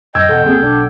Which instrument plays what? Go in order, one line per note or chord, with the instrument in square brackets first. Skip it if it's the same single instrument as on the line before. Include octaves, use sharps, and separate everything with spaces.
[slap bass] F#2 [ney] D#5 [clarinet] G5 [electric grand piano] E6 G#6
[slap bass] E1 [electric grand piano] A4 F#5
[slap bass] C#2 A#3 C4 [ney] G#4
[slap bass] B1 [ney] D4